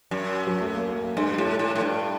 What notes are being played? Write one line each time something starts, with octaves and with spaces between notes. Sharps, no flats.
F#2
F#3
A3
A#3
A#3
A#3
G2 A3
G3
A2
A3
A2
A2
G2